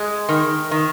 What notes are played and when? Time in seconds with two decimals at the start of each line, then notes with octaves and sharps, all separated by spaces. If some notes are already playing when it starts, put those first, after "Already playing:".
Already playing: G#3
0.29 D#3
0.71 D#3